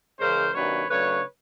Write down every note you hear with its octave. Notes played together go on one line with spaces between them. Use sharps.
C#3 E3 G#3 C#4 A#4 C5
C3 D#3 F#3 A#3 D4 B4 C#5
C#3 F#3 A3 D4 B4 C#5